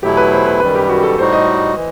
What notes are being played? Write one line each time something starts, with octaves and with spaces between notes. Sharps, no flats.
E2 B2 F#3 A3 E4 G4
B4
C5
B4
F#2 D#3 G3 B4
G4
F#4
A4
A2 G3 D#4 F#4 C5
D#5
E3